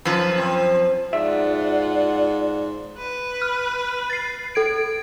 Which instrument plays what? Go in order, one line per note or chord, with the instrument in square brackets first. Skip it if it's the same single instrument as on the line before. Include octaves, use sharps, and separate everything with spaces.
[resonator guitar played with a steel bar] F#2 F3 [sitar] B4
[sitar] C4
[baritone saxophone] G#2 [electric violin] F4 F#5 [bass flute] D5 [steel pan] E5
[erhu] B4
[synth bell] F6
A6 C7
A4 G#6 D7